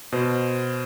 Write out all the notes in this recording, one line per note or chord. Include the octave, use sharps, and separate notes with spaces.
B2 C5